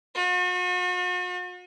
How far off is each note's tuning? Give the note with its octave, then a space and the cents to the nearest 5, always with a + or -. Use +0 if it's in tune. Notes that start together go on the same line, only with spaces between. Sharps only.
F#4 -45